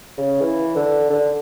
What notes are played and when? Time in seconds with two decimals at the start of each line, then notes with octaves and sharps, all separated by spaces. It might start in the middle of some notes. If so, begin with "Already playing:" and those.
0.17 C#3
0.41 E3
0.75 D3
1.10 D3